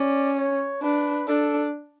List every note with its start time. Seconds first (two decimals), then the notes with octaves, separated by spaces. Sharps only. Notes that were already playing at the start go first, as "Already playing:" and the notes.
Already playing: C#4 D5
0.38 C#5
0.82 D4 B4
1.28 D4 A4